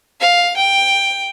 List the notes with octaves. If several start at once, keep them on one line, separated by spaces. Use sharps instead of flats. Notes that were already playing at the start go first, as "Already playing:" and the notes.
F5
G5